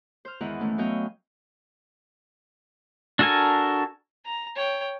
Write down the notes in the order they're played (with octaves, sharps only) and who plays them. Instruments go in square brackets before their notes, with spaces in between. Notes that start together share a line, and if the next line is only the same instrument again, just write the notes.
[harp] C5 F6
E2 G#2 D#3 E4 D#5 F#5
E3 A3 C#4
F#3 B3 C#5 D#5 F5 G5
[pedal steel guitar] D4 F#4 A4 A#4 G#5
[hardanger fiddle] A#5
C#5 G5